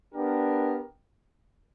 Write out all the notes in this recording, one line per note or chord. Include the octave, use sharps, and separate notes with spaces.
B3 D4 G4 A#4